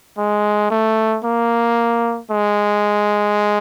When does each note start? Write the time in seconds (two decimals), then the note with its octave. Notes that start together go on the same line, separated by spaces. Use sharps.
0.18 G#3
0.70 A3
1.24 A#3
2.31 G#3